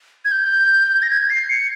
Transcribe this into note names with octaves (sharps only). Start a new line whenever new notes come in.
G#6
G6
A#6
G#6
C7
C#7